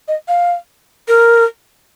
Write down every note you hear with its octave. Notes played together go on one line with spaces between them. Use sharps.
D#5
F5
A#4